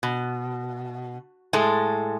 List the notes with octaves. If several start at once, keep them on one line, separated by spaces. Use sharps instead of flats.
B2
A2 G#3 A4